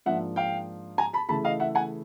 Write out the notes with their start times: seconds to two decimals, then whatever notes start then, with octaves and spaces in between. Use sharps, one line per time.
0.06 G#2 F3 A#3 D4 E5 F#5
0.36 F5 G5
0.98 G#5 A#5
1.13 A5 B5
1.29 C#3 E3 A3 C#4 E4 A5 B5
1.44 D#5 F5
1.60 E5 F#5
1.75 F#5 G#5